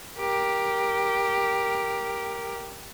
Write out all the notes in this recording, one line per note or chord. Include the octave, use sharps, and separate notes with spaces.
G4 A#4